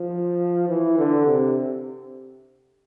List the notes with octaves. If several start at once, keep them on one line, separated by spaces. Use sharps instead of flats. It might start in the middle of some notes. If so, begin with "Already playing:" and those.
Already playing: F3
E3
D3
C3